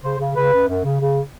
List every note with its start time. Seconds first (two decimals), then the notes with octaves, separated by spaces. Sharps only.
0.03 C#3 C5
0.19 C#3
0.36 C#3 B4
0.52 F#2
0.69 F#2
0.84 C#3
1.00 C#3